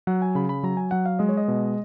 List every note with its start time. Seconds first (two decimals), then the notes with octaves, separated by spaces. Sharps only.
0.07 F#3 F#5
0.22 G#5
0.35 C#3 B5
0.49 B5
0.63 F#3 A#5
0.77 G#5
0.91 F#3 F#5
1.06 F5
1.19 G#3 D#5
1.29 C#5
1.37 D#5
1.48 B2